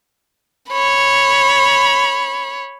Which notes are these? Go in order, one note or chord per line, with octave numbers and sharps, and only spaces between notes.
C#5 B5